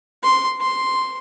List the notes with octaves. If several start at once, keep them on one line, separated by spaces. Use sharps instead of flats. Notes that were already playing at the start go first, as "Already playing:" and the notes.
C6
C6